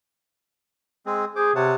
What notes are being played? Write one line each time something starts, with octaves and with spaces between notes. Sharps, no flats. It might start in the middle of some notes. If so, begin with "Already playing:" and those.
G#3 C4 G#4
G#4 C5 D6
C3 C#5 F#5 A5